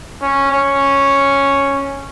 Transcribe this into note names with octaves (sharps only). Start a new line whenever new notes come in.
C#4
C#4